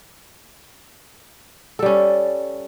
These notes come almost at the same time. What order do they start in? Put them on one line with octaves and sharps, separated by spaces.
A4 G3 C#4